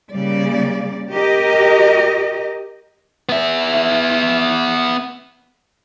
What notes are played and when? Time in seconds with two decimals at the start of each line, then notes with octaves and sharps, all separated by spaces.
0.13 C#3 G3 A#3 D5
1.13 G4 A#4 D#5
3.29 B3 E5